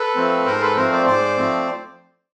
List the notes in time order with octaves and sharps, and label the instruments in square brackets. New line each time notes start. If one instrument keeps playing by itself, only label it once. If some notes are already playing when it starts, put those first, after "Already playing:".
Already playing: [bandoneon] A4 B4
F3 A3 C4
G#2 A#4 C5
A4 B4
F3 A3 C4 A#4 C5
C5 D5
G#2 C5 D5
F3 A3 C4